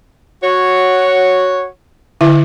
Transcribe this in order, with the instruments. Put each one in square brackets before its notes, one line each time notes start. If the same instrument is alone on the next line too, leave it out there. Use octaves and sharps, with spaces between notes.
[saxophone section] F#4 C#5
[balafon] D3 E4 E5